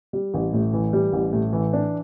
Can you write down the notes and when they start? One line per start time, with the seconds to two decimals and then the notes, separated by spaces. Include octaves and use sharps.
0.13 G3
0.34 A1
0.53 A2
0.73 E3
0.93 G3
1.13 A1
1.33 A2
1.53 E3
1.73 D4